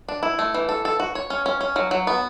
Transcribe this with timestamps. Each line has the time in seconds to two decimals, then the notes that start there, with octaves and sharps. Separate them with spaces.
0.08 D4
0.23 E4
0.39 A3
0.54 E3
0.69 A4
0.85 A4
1.00 F#4
1.15 C#5
1.30 C#4
1.46 C#4
1.61 C#4
1.76 F#3
1.91 F#3
2.07 B3